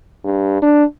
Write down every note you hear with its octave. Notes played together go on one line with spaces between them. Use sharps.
G2
D4